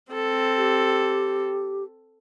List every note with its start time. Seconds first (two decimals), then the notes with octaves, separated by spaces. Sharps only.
0.13 C4 A4
0.57 G4